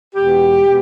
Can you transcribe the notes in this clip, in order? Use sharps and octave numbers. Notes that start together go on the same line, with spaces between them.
E2 B2 G#3 G4
B2 G#3